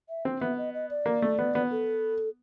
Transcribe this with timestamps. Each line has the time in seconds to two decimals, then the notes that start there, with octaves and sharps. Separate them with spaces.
0.09 E5
0.25 C4
0.41 B3 E5
0.57 D#5
0.74 D#5
0.90 D5
1.06 A#3
1.22 A3
1.39 B3
1.55 B3
1.71 A4